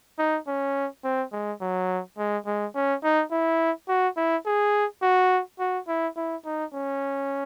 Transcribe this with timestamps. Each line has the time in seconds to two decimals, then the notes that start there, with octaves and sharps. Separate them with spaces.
0.19 D#4
0.48 C#4
1.04 C4
1.33 G#3
1.61 F#3
2.18 G#3
2.47 G#3
2.75 C#4
3.04 D#4
3.32 E4
3.89 F#4
4.17 E4
4.46 G#4
5.02 F#4
5.59 F#4
5.88 E4
6.17 E4
6.45 D#4
6.74 C#4